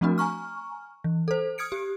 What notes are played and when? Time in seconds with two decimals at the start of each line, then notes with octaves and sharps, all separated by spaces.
0.01 F3 A3 C4 D4 F#4 A#4
0.18 G#5 A#5 C#6 F6
1.04 E3
1.28 A4 C5
1.58 D#6 F6 G#6 C#7 D7
1.72 G4